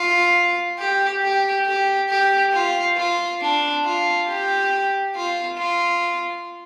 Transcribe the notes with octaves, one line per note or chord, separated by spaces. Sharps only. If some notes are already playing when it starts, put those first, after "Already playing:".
Already playing: F4
G4
G4
G4
G4
F4
F4
D4
F4
G4
F4
F4